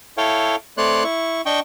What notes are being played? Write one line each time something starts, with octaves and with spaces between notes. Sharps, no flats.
E4 A4 C#5 F5 G5
A3 C4 C#5 D5 C6 F#6
E4 C#6
D4 D#5 G5 C#6